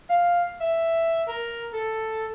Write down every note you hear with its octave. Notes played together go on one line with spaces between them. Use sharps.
F5
E5
A#4
A4